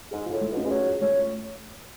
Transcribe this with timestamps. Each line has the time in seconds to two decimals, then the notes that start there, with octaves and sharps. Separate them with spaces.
0.11 G#2 G#4
0.26 F4
0.32 A2
0.41 A3
0.52 B2
0.57 C#4
0.66 G#3
0.70 F#3 G#4
0.86 F4
1.01 A3 C#4